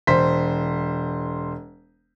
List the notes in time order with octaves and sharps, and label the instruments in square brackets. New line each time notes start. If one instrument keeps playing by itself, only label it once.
[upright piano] E1 C5 B6